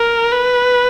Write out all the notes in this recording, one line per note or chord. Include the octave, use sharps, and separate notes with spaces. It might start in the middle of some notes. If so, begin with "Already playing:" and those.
Already playing: A#4
B4